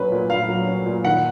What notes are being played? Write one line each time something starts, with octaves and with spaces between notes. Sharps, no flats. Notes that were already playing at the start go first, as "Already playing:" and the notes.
Already playing: A#2 F#3 C#4 B4
A#2
A#2 F5
F#3
C#4
A#2
D#3 F#5